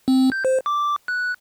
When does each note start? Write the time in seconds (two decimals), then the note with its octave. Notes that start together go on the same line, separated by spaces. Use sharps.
0.08 C4
0.32 G6
0.45 C5
0.66 D6
1.08 F#6